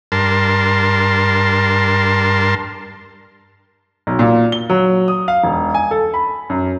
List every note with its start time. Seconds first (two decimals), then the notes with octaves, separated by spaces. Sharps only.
0.12 G2 A#4 A5 C6
4.07 B1
4.19 A#2
4.52 G7
4.70 F#3
5.08 D#6
5.28 F5
5.44 E1
5.74 G#5
5.91 A4
6.14 B5
6.50 F#2